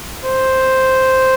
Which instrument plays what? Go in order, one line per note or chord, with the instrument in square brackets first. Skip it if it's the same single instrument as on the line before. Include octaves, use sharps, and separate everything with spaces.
[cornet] C5